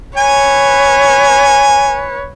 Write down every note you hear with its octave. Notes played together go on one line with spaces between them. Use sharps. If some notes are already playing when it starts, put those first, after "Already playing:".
B4 C#5 G#5